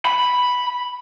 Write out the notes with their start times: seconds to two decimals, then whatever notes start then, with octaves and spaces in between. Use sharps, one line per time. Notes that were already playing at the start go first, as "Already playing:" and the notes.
0.05 B5